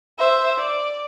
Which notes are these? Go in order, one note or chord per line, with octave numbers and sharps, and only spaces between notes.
C5 E5
D5